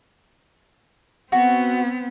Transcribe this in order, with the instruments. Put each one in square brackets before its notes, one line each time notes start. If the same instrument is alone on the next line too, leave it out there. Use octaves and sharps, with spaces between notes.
[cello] B3 C4 [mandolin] F#4